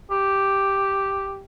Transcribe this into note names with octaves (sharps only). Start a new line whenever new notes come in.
G4